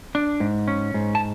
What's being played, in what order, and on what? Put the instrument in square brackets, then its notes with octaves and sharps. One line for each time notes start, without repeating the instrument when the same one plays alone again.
[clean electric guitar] D4
G#2
C#4
G#2
A5